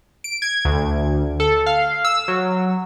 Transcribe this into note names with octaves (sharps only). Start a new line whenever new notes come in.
D7
G#6
D2
A4
F5
E6
F#3